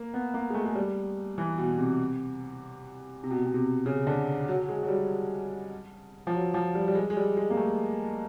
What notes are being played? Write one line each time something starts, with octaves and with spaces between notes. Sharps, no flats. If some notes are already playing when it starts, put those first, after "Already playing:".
Already playing: A#3
B3
A#3
G#3
A3
G#3
G3
E3
B2
C3
C3
B2
B2
C3
C#3
D3
F#3
G#3
F#3
G3
F3
F#3
F3
G3
G3
G#3
G#3
G3
G#3
A#3
A3